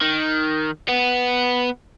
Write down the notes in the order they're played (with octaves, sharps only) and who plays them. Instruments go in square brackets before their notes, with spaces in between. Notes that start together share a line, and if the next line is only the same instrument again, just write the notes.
[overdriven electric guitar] D#3
B3